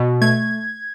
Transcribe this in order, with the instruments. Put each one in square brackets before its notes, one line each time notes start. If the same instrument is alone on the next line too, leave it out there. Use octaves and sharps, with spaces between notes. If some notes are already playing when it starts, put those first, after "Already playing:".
Already playing: [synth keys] B2
A3 G#6